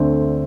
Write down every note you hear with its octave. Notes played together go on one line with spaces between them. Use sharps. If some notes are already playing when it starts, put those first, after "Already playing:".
Already playing: D2 D3 A3 C4